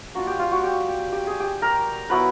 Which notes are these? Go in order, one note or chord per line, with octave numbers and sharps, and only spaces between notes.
A#3 D4 F4 F#4
G4
F4
F#4
G4
G4
G#4
G4
A#4
F#3 B3 E4 B4